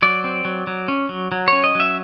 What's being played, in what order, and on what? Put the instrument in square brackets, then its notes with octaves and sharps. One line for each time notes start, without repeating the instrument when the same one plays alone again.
[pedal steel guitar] F#3 D5
C4
F#3
F#3
C#4
F#3
F#3
C#4 C#5
D#5
F#3 E5